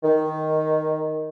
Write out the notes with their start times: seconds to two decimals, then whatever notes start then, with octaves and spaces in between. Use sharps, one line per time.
0.03 D#3